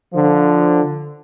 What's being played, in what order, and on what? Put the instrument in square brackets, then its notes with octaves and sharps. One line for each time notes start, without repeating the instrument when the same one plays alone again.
[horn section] D3 F3